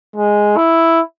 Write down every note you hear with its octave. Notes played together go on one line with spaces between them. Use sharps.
G#3
E4